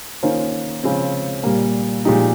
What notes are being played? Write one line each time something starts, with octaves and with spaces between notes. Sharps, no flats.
D#3 A#3 C#4 F4 C5
C#3 F3 G#3 C4
A#2 G3 A#3
A#2 F3 G#3 D#4 G4